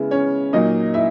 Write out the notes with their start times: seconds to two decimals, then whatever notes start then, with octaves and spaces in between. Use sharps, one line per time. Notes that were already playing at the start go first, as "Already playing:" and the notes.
Already playing: C#3 G#3 B3 E4
0.11 C#4 C#5
0.53 A#2 F#3 A#3 D#4 D#5
0.94 E4 E5